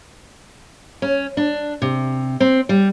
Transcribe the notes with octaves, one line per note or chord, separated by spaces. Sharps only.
C#4
D4
C3
C4
G3